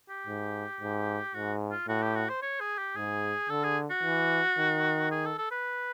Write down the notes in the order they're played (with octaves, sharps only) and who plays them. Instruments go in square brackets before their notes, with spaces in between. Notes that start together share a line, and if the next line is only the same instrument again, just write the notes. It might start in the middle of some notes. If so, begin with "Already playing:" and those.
[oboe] G4
[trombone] G#2
G#2
[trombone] G#2 [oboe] F#4
[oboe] F4
[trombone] A2 [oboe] F#4
[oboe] G4
F#4
C5
C#5
G#4
G4
[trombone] G#2 [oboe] G#4
[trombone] D3 [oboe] A4
[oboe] G#4
F#4
[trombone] E3
D#3
[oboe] G#4
A4
A4
B4